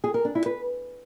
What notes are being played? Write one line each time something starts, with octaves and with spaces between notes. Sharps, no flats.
G#4
A#4
D4
E4
B4